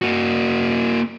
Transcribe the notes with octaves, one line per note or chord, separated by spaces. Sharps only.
A#3 F#4